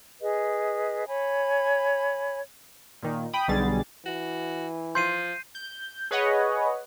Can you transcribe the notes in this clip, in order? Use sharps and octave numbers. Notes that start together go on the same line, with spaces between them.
G#4 B4 D#5
C#5 G#5 B5
A#2 D#3
G5 B5 D#6
B1 B2 D3 G3 G#4 A6
E3 F#4
F3 C6 G6 C7 D#7
G6
G#4 B4 C#5 D#5 F#5